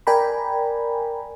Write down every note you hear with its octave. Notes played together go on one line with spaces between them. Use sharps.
A#4 D5 G5 G#5 A#5 B5